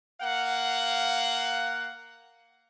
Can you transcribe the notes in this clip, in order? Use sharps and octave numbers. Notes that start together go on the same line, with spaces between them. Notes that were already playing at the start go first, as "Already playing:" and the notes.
A#3 F5 F#5